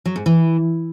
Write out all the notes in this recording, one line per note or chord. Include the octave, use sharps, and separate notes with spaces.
F#3
G#2
E3